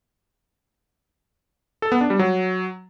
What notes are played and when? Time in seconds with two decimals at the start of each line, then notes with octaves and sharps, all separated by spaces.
1.82 A4
1.92 B3
2.01 D4
2.10 G3
2.19 F#3